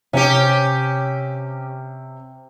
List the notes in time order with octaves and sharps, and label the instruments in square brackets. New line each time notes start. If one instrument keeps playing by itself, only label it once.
[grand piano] C3 [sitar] C#4 G4